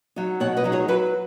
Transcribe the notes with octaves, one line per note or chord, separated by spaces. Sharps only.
F#3 D#4
B2 C#5 F#5
B4 D#5
F#3 D#4
G#4 C#5
F#3 F#4 B4